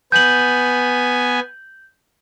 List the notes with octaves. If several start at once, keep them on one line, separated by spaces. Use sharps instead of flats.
B3 G#5 G6 F#7